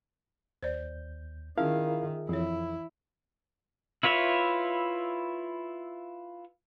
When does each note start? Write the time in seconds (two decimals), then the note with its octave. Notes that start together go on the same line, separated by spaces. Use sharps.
0.63 D#2 C5 D5 G6
1.58 D#3 C#4 E4 F4 G#4 A#4 E5 F5
2.29 F2 E3 E4 C#5
4.03 E4 F4 B4 C#5 E5